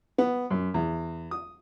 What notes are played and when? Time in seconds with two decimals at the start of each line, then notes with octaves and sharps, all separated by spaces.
0.18 B3
0.51 F#2
0.74 E2
1.31 D#6